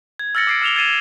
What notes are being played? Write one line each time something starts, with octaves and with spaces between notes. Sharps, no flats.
G#6
E6 F6 A6 A#6 C#7 F#7
D6 C7 D7
D6 F6 E7 F7 G7
E6 G#6 A6 C7 D#7 E7